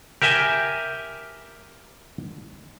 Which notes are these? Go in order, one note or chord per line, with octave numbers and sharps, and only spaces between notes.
G4 A#4 E5 G5 G#5